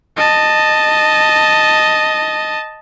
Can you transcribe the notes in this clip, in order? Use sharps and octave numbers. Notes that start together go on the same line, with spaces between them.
D#5 A5